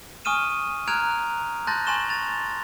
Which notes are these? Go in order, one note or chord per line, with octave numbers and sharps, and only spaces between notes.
G#5 C#6 D#6 F6 D#7 E7
A#5 F6 F#6 G#6 D7 F7
A5 C6 F#6 G6 A6 A#6
G#5 A5 C6 C#6 E7 G7
A6 F7